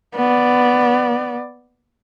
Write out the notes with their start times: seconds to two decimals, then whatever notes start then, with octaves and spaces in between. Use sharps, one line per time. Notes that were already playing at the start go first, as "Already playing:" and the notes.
0.15 B3 D5